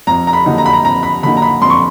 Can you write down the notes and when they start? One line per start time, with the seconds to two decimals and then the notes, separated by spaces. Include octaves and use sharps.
0.07 F2 A#5
0.27 A#5
0.33 B5
0.46 D3 F#3 A#3 D#4
0.58 A#5
0.66 B5
0.73 A#5
0.84 F2 A#5
1.03 B5
1.23 D3 F#3 A#3 D#4 B5
1.37 A#5
1.42 B5
1.62 F2 C6
1.70 C#6